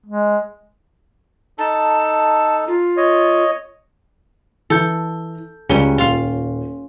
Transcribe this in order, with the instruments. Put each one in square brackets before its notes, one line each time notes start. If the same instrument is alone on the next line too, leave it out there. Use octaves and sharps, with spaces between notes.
[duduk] G#3
[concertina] D#4 A4 [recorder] A5
[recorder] F4
[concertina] C#5 D#5
[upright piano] E3 G6 [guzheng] A4
[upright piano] C#2 G7 [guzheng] G3 C#4
[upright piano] D#1 [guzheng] F4 F5